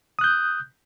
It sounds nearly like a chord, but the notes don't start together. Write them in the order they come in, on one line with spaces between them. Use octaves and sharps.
D#6 F#6 G6